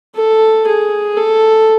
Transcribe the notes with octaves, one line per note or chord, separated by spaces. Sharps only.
A4
G#4
A4